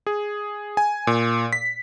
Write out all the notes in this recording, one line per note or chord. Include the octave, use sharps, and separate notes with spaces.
G#4
G#5
A#2
B6